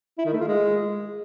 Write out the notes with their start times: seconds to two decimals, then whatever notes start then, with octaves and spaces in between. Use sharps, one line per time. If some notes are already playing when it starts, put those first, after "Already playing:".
0.18 E4
0.25 D#3
0.33 A3
0.40 F4
0.48 G#3